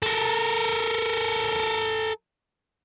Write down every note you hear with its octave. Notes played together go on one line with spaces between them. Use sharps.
A4 A#4